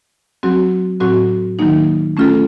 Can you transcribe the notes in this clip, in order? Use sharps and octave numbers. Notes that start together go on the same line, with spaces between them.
F#3 C4 F#4
A2 F#3 C4 F#4
D#3 F#3 A#3 D#4
A3 C#4 F4 A4